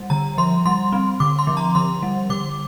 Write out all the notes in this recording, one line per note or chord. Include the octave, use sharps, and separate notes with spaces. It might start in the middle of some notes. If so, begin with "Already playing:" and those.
Already playing: G3
D3 A#5
F3 C6
G3 C6
C4
D3 D6
C6
F3
A#5
D3 C6
G3
D3 D6